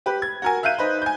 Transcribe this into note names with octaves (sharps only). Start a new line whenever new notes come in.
G4 B4
G#6
F#4 A#4 G#5
E5 F5 F#6 G6 D#7
D#4 B4 C5
G#5 G6